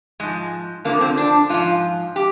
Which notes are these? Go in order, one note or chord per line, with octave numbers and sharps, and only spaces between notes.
G#2 F3 G#3
F2 D3 F3 A#3
C4
D4
G#2 F3 F4
G4